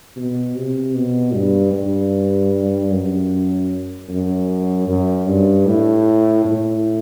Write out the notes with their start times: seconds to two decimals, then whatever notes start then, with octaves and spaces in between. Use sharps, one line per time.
0.16 B2
0.55 C3
0.94 B2
1.34 G2
1.73 G2
2.91 F#2
4.09 F#2
4.88 F#2
5.27 G2
5.66 A2
6.44 A2